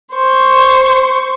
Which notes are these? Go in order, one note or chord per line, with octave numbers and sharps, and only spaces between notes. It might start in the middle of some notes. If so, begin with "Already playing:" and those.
C5 C#6